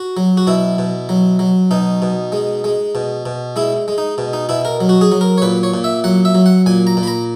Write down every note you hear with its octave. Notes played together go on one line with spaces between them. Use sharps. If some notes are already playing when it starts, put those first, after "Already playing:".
Already playing: F#4
F#3
F#4
B2 E4
B2
F#3
F#3
B2 D#4
B2
G#3
G#3
B2
B2
G#3 E4
G#3
D#4
B2
D#4
B2 E4
A#4
F#3
F#4
G#4
F#3
A#4
C#5
A#2 B4
C#5
A#2
E5
F#3 F#5
E5
F#3
F#5
A#2 G#5
A#5
A#2
B5
A#5